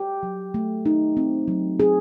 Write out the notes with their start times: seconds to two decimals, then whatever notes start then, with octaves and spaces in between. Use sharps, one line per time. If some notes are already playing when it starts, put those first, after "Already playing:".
Already playing: G4
0.23 F#3
0.54 A3
0.86 D#4
1.17 C4
1.48 F#3
1.80 C4 G#4